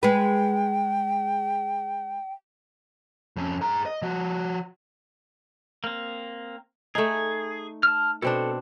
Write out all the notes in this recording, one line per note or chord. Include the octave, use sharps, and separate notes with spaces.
G#3 B4 G5
F2 C#4
G#4 A#5
D#5
F3 F#4
A#3 C4
A3 D#4 G#4
A5 F6
B2 C4 D4 A4